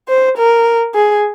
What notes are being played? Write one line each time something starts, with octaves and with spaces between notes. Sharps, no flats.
C5
A#4
G#4